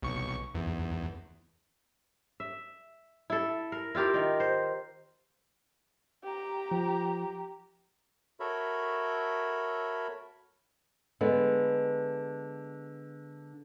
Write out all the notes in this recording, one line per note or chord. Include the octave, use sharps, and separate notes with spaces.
B1 C#6
E2
E5
E4 A4
A#4
E4 F4 G4 A#4
D#3 D#4
C5
G4 A#5
F3
F#4 A4 A#4 C#5 E5 B5
D3 G#3 B3